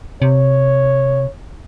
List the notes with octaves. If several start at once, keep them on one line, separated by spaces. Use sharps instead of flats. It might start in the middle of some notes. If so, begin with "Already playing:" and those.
C3 C#5